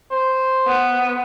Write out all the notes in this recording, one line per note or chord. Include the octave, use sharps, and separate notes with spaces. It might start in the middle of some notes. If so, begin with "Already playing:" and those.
C5
B3